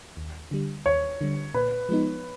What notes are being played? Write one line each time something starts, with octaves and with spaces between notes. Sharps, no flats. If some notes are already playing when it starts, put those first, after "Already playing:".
D#2
D3 G3
D#2 C#5
D3 G3
A#2 B4
F3 G#3 B3 D#4